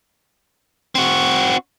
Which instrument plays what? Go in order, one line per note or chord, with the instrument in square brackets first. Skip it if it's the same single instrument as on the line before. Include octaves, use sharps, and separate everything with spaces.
[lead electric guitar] C4 F#4